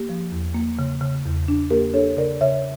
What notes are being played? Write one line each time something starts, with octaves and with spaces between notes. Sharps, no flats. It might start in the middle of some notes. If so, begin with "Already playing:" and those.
Already playing: A#3 G4
F3
E2
A#3
C#3
C#3
E2
D4
A#3 G4 A#4
D4 A4 C#5
C#3 A#4 D5
C#3 C#5 E5